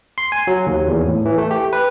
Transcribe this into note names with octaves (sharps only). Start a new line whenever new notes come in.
C6
G#5
F#3
D#2
E2
A2
E3
A3
G4
B4